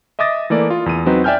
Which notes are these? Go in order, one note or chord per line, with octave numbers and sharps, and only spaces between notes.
D#5 E5 D6 D#6 A6 A#6
E3 A3 A#3 D5
F4
E2 D#7
F#3 C4 D#4 B4
D5 E5 G5 G#5 F6 G6